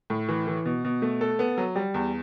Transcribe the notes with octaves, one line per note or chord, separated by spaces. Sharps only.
A2
E3
E3
B2
B2
A3
A4
B3
F#3
G3
E2